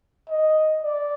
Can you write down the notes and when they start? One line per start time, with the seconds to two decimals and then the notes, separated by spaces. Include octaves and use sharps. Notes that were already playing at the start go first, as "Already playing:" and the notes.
0.29 D#5
0.83 D5